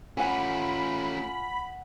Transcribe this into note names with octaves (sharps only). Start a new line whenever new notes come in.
A3 C#4 F4 F#5 G#5 B5